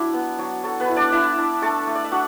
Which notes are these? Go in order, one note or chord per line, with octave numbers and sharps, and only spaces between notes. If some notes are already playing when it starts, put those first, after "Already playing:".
Already playing: F#3 D4 E4 D5
B3
F#3
F#3 A4
B3 B4
E4
D4 D5
D4 E4 E5
D4
A3 A4 A5
A3
D5
E5
D4 F#4 F#5